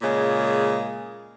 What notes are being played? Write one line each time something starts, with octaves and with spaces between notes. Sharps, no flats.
A#2 C#3 G#3